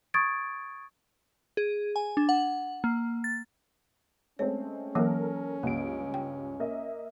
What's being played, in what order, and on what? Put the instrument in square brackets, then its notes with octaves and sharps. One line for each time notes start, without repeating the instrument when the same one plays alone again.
[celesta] C#6 D#6 G#6 A6 D7
[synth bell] G#4
G#5
D4
F#5
A#3
A6
[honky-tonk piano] G#3 A3 C4 [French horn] C#4 [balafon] C#5
[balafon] E3 F#3 A#3 [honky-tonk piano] A4 A#4
[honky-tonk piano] C#2 G2 D7 [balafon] A#3
[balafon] G5
[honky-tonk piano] A#3 D#5 E5